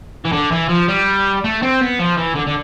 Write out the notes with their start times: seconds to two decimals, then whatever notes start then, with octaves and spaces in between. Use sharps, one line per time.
0.25 E3
0.32 D3
0.52 E3
0.69 F3
0.88 G3
1.44 A3
1.62 C4
1.81 B3
1.99 F3
2.18 E3
2.36 D3
2.47 D3